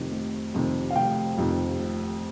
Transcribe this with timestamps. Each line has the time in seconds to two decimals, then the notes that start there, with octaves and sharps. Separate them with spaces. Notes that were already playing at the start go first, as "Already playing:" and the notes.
Already playing: F1 F2 C3 D#3
0.12 F1
0.54 F2 C3 D#3
0.90 F5
0.95 F1 G5
1.38 F2 C3 D#3
1.79 F1